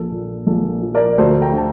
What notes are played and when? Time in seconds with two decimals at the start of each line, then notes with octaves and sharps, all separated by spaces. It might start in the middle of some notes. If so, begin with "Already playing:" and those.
Already playing: A#1 A4
0.11 A#2
0.46 A#1 A4
0.82 F3
0.94 A#4 D5
1.18 D2 A4 C5
1.41 G5 A#5
1.53 D3 A5